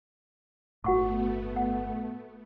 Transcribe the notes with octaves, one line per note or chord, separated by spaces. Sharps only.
G1 A2 A3 B3 F#4 F#5 C#6
F#5